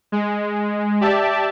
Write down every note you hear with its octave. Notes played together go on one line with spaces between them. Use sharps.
G#3
G4 D5 E5 A5